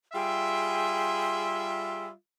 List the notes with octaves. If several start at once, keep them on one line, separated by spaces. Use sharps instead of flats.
G3 F4 G#4 E5 G5 C6